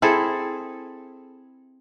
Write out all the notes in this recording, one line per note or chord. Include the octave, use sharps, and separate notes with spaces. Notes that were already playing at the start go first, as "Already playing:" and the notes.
C4 E4 G#4 A4